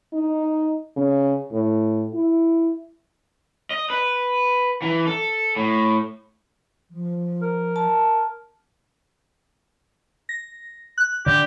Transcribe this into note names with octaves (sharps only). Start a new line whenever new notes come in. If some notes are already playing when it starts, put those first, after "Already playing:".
D#4
C#3
A2
E4
D#5
B4
E3
A4
A2
F3
A#4
A5
A#6
F#6
D3 G4